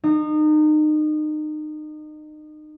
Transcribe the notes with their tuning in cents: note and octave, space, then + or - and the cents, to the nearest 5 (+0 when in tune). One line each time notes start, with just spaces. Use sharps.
D#4 -30